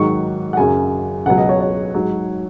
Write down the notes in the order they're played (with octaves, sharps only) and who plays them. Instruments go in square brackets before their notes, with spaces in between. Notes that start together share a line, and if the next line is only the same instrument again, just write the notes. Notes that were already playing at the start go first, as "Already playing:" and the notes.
Already playing: [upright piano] G#2 D#3 F#3 C#6
F#5
F#2 C#3 F#3 G#5
C#2 B2 F#3 F#5
D#5
C#5
C#5
G#2 F#3